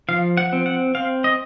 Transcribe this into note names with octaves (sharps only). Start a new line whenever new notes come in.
F3 F5
F#5
C4
F#5
C4 F5
D#5